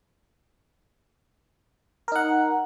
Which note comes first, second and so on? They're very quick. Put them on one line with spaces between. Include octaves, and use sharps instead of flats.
A#4 D#4 F#5